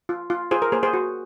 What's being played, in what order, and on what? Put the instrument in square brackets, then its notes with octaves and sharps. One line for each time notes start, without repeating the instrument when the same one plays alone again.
[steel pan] F4
F4
F4 G#4 C5
A#4
A#3 G#4 C5
G#4 C5
F#4